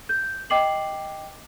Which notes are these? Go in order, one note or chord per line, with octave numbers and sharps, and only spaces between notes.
G6
D#5 G5 D6 C7 F#7